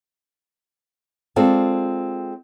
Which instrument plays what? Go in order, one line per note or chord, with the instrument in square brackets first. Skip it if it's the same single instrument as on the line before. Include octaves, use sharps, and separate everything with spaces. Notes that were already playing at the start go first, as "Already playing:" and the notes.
[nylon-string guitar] G#3 C4 F4 A4 D5